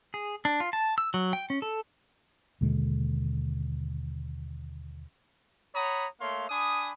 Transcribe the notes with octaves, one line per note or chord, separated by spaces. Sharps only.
G#4
D4
F4
A5
E6
F#3
G5
C#4
A4
D#2 B2 D3 G#3
C#5 F#5 A#5 B5 D#6
A3 A#3 C#5 F5 C6
D4 G#5 B5 D#6